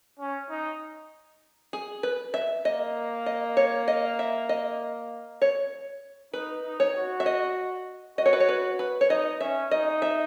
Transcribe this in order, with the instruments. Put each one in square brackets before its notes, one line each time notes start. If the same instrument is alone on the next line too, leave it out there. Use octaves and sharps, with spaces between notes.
[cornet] C#4
D#4
[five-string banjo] G#4
B4
E5
[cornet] A#3 [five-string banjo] D#5
[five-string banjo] D#5
C#5
D#5
E5
D#5
C#5
[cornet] D#4 [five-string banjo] B4
[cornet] D#4
[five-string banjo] C#5
[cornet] F#4
[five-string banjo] E5
D#5
[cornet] F#4 [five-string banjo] D#5
[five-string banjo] C#5
B4
C#5
B4
B4
C#5
[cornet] D#4 [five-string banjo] D#5
[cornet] C#4 [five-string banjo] E5
[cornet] D#4 [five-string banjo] D#5
[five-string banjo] E5